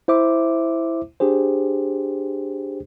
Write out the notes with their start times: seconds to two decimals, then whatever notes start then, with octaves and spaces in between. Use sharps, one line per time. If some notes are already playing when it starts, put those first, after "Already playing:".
0.08 E4 C5 E5 D6
1.20 D4 G4 G#4 C5